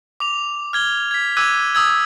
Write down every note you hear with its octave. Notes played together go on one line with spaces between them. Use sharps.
D6 F7
F6 G#6 G7
G#6 B6
D6 E6 F#6 G#6 D#7
D#6 E6 G#6